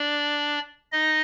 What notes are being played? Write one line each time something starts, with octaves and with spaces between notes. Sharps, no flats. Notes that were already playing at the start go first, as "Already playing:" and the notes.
Already playing: D4 D5
D#4 D#5